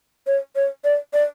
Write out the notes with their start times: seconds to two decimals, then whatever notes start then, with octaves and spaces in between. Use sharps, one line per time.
0.27 C#5
0.56 C#5
0.84 D5
1.13 D5